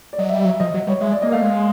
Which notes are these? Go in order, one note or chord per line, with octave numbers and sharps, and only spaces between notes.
D5
F#3 D#5
E5
G3
E5
F#3
E5
F3 D#5
F#3
G3 C#5
G#3 E5
D5
A#3 D#5
A3 F5
G#3